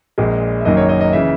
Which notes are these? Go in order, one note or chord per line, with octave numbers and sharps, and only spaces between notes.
A#1 A#2 G#3
E5
F#1 F#2 D#3 F#3 A#3 D#5
C#5
D#5
D#5
C#3 E3 E5